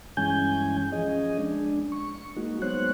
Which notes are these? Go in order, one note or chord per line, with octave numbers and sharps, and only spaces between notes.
G2 E3 G#3 C#4 G#5 G6
F3 C#4 G#4 D#5
G#3 D4
C#6
G#3 A#3 D#4 F#4
F#3 G#3 B3 C5 C#5 F#6